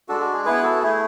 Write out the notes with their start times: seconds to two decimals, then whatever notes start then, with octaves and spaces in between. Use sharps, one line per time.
0.08 G#3 D4 F#4 A4
0.21 F#4
0.33 G#4
0.45 B3 E4 G#4 B4
0.63 F#4 A4
0.82 A3 E4 G#4